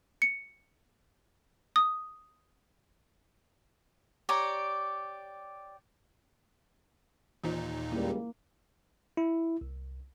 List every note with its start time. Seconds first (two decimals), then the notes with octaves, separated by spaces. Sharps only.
0.22 C#7
1.76 D#6
4.29 G4 C#5 D5 A#5
7.44 D#2 A#2 E3 D#4 F4 C5
7.92 C#2 G3 A#3 E4
9.17 E4
9.61 C2